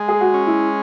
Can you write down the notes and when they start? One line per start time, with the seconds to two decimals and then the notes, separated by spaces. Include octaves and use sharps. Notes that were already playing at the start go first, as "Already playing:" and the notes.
Already playing: G#3
0.08 G#4
0.21 F#4
0.34 C#4
0.47 E4